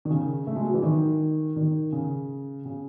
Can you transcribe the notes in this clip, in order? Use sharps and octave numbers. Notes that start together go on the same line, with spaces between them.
D#3
C#3
A3
G#3
F#3
E3
D#3
D#3
C#3
C#3